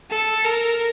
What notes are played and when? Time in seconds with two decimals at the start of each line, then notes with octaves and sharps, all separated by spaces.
0.10 A4
0.45 A#4